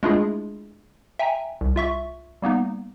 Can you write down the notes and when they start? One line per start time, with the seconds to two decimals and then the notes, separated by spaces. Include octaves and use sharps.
0.03 G#3 A3 D4 E4 F4 G#4
1.19 E5 G5 G#5 A#5
1.61 C2
1.76 F4 E5 C#6
2.42 G3 A#3 B3 D#4